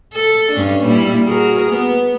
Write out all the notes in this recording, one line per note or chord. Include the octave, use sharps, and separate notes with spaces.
A4
G2 C#4 D4
A#2 G3 E4
F#4 G#4 A#4
B3